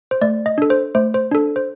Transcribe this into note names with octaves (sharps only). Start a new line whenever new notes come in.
C5
A3 D5
D#5
D4 A4
C5
A3 C5
C5
D4 A4
C5